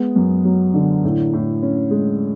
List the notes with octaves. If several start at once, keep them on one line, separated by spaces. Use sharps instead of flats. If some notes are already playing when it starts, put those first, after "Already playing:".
Already playing: G#3 B3
F#2
F#3
D3
A2
A2
C#4
G#3